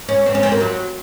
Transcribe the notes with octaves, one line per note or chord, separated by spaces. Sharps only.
C#4
C4
C#4
C4
A#3
F#3